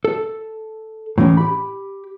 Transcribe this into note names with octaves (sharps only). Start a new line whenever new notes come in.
A4
A2 E3 C#4
G4 B5